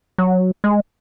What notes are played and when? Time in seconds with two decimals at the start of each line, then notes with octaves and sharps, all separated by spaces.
0.18 F#3
0.64 G#3